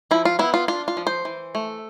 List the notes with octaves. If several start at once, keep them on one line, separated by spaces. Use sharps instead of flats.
F3 E4
F4
B3 E4
F4
D4 F4
F4
F3
C5
E3
A3